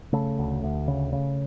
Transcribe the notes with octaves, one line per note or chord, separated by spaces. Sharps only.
C#3 A3
D2
D2
C#3
C#3